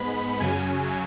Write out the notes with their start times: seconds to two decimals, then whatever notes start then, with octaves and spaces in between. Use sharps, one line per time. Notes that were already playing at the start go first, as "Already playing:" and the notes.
Already playing: G#2 G#3 B3 B5
0.40 F#2 C#3 F#3 G#5